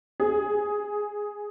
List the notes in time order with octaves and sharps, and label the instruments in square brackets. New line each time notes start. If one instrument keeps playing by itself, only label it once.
[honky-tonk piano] G#4